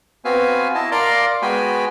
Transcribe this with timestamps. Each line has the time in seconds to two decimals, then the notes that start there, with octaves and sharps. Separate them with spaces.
0.25 B3 C4 F#4 B4 F5 G#5
0.75 E4 D#5 A5
0.92 A#4 D5 F5 A#5 C6 D6
1.42 G#3 B3 F#4 G5 G#5 B5